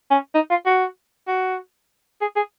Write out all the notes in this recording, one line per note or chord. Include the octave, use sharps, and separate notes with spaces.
C#4
D#4
F4
F#4
F#4
G#4
G#4